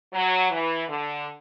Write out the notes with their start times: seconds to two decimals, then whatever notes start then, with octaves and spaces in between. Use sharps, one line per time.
0.13 F#3
0.50 E3
0.88 D3